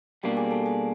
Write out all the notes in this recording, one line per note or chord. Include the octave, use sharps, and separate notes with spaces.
B2 G3 A#3 D4 G4 G5
G#4 G#5
A4 A5
G#4 G#5